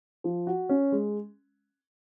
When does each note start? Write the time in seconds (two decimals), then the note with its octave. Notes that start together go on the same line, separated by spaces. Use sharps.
0.24 F3
0.47 F#4
0.69 C#4
0.92 G#3